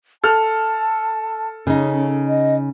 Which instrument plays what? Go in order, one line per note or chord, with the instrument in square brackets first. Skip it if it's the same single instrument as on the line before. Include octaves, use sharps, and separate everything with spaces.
[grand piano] A4 F6 [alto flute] A5
[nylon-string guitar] C#3 D#4 [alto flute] C#4
[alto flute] D#5